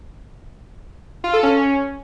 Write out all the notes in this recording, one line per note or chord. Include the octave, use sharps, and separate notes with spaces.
F4
A4
C#4